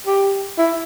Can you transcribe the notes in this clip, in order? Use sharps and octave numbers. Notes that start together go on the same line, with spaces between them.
G4
E4